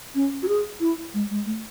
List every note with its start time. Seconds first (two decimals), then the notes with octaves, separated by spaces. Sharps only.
0.15 C#4
0.43 F#4
0.48 G#4
0.80 E4
1.14 G#3
1.31 G#3
1.46 A3